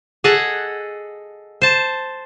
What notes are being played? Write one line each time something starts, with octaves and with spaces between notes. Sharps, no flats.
G#4 A4 D#5 F#5
C5 A5